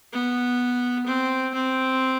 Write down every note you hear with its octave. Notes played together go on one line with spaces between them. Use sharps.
B3
C4
C4